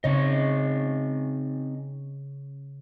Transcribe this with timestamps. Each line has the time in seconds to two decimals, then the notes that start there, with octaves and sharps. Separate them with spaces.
0.04 C#3 C4 D#4 C#5 D#5